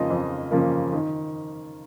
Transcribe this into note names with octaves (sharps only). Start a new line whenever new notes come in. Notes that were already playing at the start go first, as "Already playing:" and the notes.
Already playing: F2 C#3 F3 A#3 D#5
F2
C#3 F3 A#3
D#3